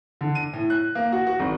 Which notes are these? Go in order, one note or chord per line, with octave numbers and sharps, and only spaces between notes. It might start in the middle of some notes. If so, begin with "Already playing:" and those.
D3
D#7
A2
F#6
A#3
F#4
F#4
G#1